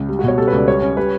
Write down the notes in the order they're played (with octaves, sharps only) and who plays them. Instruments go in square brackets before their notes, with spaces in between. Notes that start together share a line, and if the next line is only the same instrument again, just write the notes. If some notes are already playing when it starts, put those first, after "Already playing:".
Already playing: [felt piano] C#2
G3
[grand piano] F#4
[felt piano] B2 [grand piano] C#5
[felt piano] G3 [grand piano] A4
[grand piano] B4
[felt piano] C#2 [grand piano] D5
[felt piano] G3 [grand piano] C#5
[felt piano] C#4
[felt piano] G3 [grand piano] B4